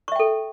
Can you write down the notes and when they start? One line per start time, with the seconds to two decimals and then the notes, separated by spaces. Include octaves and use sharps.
0.08 C#6
0.12 E5
0.16 G5
0.19 A4